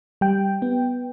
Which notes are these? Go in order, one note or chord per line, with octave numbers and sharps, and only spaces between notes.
G3 G5
B3